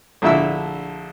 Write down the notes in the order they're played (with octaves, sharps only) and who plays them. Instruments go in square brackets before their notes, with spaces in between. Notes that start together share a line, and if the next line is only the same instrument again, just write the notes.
[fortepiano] A#1 D3 A3 E4 E5 E6